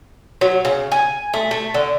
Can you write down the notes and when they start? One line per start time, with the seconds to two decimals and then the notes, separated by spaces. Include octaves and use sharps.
0.41 F#3
0.65 C#3
0.92 G#5
1.34 A3
1.51 A3
1.74 D3